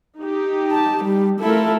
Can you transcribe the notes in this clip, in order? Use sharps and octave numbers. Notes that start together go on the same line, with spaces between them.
D#4 G4
A5
G3
A3 E4 F4 A4 A#4